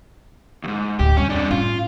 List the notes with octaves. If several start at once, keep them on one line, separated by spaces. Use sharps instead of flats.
D#2 G#2
D2 A2 G4
F2 G3 C#4
C3 D4
A2 C#4 F4